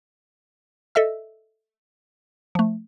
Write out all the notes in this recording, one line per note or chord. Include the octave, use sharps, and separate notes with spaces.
A4 D#5 E5 E6
F3 A3